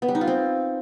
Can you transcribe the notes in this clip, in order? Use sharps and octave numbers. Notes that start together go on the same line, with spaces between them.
B3
G3
D#4
F4
C4